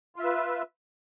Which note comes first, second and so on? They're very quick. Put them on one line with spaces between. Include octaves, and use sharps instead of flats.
F4 E5 B4